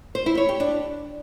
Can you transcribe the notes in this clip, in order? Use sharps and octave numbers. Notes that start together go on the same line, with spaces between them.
C5
E4
C#5
G4
D4